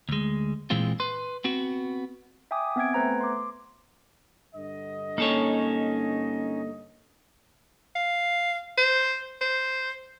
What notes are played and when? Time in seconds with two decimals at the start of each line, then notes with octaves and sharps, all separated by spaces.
0.09 D2 G#3
0.70 A#2 E3 G#3 C4 F4
1.00 B4 C6
1.44 B3 C4 F#4
2.51 E5 G5 G#5 D6 D#6
2.76 B3 C4 E5 G#5 G#6 D7
2.94 A3 B3 B4 C5 A#5 G#6
3.21 C6 D6
4.54 G2 D3 D#5
5.18 A#3 C#4 D#4 A4 C#5
7.95 F5
8.77 C5
9.41 C5